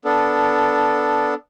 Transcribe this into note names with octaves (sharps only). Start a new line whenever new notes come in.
B3 D4 A4